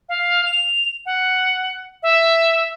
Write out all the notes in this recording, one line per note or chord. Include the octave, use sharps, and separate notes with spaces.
F5
F7
F#5
E5